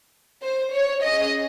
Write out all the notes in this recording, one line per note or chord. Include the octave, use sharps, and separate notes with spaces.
C5
C#5
C#4 G#4 D#5